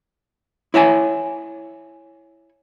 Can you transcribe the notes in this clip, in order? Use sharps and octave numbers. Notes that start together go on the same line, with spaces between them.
E4 C#5 E5 G#5